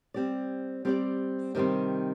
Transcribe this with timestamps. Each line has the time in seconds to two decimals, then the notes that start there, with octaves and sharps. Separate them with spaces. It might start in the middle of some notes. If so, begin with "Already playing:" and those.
0.14 G3 C4 G4 D5
0.85 G3 C4 G4 D5
1.55 C3 D#3 G3 C4